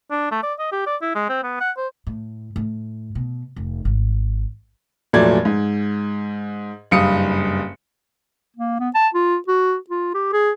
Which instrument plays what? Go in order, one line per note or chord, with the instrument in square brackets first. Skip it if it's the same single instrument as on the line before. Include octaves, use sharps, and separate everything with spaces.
[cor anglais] D4
A3
D5
D#5
G4
D5
E4
G#3
C4
B3
F#5
C5
[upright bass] A2
A2
B2
F1
G#1
[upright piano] F1 A#2 F#3 A3 D5 G#6
G#2
F#1 G2 F5 D#6 C#7
[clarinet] A#3
B3
A5
F4
F#4
F4
G4
G#4